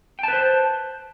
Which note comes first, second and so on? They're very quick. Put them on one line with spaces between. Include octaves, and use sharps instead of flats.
G5 A5 B4 C5